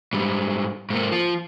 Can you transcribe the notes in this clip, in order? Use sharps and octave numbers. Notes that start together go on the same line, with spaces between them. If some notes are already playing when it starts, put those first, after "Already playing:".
G#2 G3
G#2 A#3
F3 F4